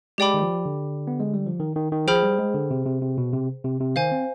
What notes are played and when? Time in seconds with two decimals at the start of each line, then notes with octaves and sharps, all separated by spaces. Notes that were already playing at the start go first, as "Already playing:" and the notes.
0.18 G#3 G4 D5 G5 B5 D6
0.34 D#3
0.42 F3
0.66 D3
1.07 B3
1.20 G#3
1.34 G3
1.47 F3
1.60 D#3
1.76 D#3
1.92 D#3
2.07 F3 G#4 C5 G5 B5 F6
2.23 G3
2.39 G#3
2.54 D3
2.71 C3
2.86 C3
3.02 C3
3.18 B2
3.33 C3
3.64 C3
3.80 C3
3.96 D#3 C5 F5 G#5
4.12 C4